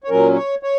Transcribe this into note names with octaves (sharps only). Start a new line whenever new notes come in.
C#5
A#2 F#3 C#4 A#4
C#5
C#5